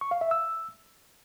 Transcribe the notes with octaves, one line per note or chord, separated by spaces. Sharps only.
C#6
F5
E5
E6